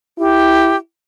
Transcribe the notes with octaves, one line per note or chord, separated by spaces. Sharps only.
E4 G4